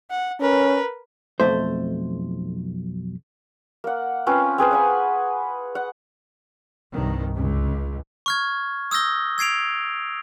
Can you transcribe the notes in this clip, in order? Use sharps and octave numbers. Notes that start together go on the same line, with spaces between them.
F#5
C#4 A#4 B4
B1 F2 A3 C5
A#3 F#5
C4 C#4 F4 B4
C4 G#4 B4 C5
F#5 G#5 B5
F#5
C2 G2 D#3
C#2
C#6 F6 G#6
D#6 E6 G6 A#6 G7
E6 G#6 C7 D7 F7